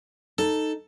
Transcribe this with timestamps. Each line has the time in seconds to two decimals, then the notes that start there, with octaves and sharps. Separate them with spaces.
0.38 D#4 A4